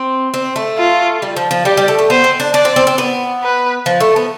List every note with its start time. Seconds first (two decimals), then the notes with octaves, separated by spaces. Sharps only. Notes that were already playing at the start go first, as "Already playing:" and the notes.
Already playing: C4
0.34 C4
0.56 A3
0.78 F4
1.22 G3
1.36 F3
1.51 F3
1.65 G3 G4
1.77 G3
1.88 A3
1.99 A3
2.10 B3 C5
2.24 C4
2.40 D4
2.53 D4 D5
2.65 C4
2.76 C4
2.87 C4
2.98 B3
3.43 B4
3.86 F3
4.00 A3
4.16 B3